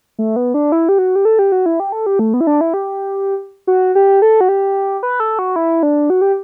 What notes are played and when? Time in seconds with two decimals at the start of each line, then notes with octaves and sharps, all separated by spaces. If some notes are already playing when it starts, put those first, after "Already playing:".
0.19 A3
0.36 B3
0.54 D4
0.72 E4
0.89 G4
0.98 F#4
1.16 G4
1.25 A4
1.39 G4
1.52 F#4
1.66 E4
1.80 G4
1.92 A4
2.06 G4
2.19 A3
2.34 B3
2.41 E4
2.47 D4
2.61 E4
2.74 G4
3.67 F#4
3.95 G4
4.22 A4
4.41 F#4
4.48 G4
5.03 B4
5.20 A4
5.39 F#4
5.56 E4
5.83 D4
6.10 F#4
6.21 G4